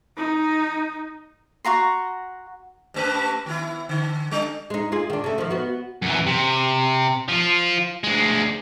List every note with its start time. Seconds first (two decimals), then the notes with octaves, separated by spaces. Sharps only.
0.17 D#4
1.65 F#4 F#5 A#5 C6
2.94 G2 A3 B4
3.46 D#3 B3 E4
3.89 D3
4.31 G3 D4
4.70 G#3 D#4
4.92 F4 G#4
5.10 D#3 D4
5.24 C#3 A3
5.38 D#3 F3
5.50 B3 F#4
6.02 F#2 E3
6.26 C3
7.28 F3 F4
8.04 D2 G#3